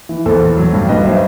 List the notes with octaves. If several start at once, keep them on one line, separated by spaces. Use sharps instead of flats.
E3
E2 A4 C5
E2
F#3
G2
G2 B4 D#5
F#3 C5 E5